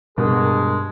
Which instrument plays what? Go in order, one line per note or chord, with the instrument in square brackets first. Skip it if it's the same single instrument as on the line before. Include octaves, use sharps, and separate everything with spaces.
[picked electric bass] G2 [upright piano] B2 [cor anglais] G#3 [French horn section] F#4 G#4 A#4